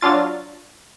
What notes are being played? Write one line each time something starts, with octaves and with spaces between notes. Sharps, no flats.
F#3 D4 F4 A6